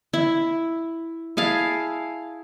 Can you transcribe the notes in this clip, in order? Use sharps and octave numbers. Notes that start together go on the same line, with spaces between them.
E4
E4 G#4 F5 A5